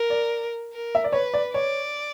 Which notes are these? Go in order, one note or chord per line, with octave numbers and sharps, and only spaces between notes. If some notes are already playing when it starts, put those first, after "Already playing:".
Already playing: A#4
D5
A#4
E5
D5
B4 C#5
D5
C#5 D5